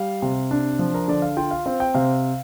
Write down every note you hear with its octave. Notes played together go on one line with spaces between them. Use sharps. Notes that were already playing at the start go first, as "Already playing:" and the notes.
Already playing: G3 F5
C3
D4
F3
A#4
D3 D5
F5
F4 G5
F5
C4 F5
G5
C3 F5